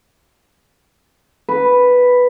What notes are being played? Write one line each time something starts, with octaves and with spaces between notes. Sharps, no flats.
B4